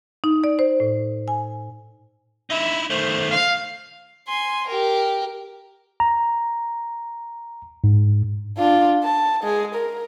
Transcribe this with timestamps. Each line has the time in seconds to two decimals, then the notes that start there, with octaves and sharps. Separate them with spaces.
0.24 D#4
0.44 D5
0.59 C5
0.80 A2
1.28 G#5
2.50 D#4 E4 E5
2.90 D#3 A3 C5
3.31 F5
4.28 G#5 C6
4.67 G4 A#4
6.00 A#5
7.84 G#2
8.57 D4 F4
9.03 A5
9.43 G#3 G#4
9.75 A#4